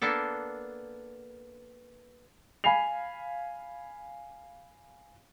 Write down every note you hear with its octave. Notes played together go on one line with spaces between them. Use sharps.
A#3 B3 D4 A4
F5 G#5 B5 C7 F7